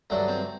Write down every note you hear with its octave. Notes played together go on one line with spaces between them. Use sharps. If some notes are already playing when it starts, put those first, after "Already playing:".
G2 F#3 A3 D4
C4